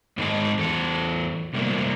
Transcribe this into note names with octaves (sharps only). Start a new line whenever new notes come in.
G#2 D#3 G#3 D4 D#4 A5
E2 A4
C3 G3 A3 A#3